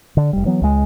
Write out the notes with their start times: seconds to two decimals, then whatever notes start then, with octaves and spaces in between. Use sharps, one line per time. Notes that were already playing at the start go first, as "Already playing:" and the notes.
0.17 D3
0.33 F1 G3
0.45 E3 F#3 B3
0.62 C#2 G#3